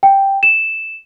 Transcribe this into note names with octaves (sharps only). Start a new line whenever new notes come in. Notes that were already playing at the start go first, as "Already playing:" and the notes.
G5
E7